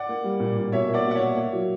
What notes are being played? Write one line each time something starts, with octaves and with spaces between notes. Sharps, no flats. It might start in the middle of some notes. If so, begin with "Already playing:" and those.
Already playing: D5 F#5
A#3
G3
A#2
A#2
B2 C#5 E5
A#3
D5 F#5
B2
F#5
C#5 E5
A#3
A#3
F#3